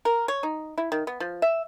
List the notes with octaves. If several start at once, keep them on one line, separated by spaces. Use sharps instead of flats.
A#4
C#5
D#4
E4
D#3
B3
F3
E5